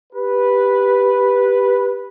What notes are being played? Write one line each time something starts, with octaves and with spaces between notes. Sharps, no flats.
G4 B4